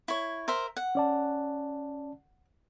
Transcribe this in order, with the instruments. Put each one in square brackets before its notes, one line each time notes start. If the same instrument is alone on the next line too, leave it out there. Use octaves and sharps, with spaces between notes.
[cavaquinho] E4 C#5
A#4 C5 E5
F#5
[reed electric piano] C#4 D5 A5